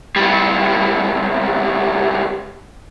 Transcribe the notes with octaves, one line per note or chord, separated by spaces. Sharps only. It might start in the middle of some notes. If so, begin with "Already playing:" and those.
C#2 G3